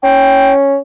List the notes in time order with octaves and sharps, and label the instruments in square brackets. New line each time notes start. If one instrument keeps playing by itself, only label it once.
[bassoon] C#4 [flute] G5